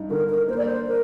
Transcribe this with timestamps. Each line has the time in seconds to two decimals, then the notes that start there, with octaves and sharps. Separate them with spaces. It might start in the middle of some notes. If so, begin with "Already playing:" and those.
Already playing: G2 D#4
0.10 D3 A#4
0.29 A#4
0.48 A#3 C5
0.57 D5
0.66 C5
0.87 A#4